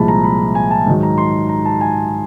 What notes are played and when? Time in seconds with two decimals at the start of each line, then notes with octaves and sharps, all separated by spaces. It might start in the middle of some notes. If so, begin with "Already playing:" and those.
Already playing: C2 A#2 F3 G#3 A5 B5
0.08 A#5
0.24 B5
0.55 G#5
0.71 A5
0.86 G#2 D#3 F#3
1.03 A#5
1.18 C6
1.49 A#5
1.65 A5
1.81 G#5